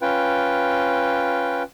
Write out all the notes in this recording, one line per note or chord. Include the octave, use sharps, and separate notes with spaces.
C#4 F4 B4 G5